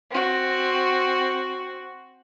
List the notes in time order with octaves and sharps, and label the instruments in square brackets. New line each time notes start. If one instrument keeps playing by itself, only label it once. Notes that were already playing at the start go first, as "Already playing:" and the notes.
[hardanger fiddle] C4 F#4